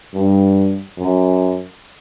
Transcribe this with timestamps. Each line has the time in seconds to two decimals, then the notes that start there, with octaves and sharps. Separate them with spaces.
0.14 G2
0.98 F#2